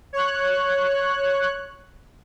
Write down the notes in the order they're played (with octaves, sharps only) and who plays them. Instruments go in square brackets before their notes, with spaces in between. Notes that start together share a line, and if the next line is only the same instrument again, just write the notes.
[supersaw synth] C#5 F#6